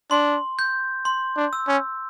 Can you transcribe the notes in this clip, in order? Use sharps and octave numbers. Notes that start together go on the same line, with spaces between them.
D4 C6
G6
C6
D4
E6
C#4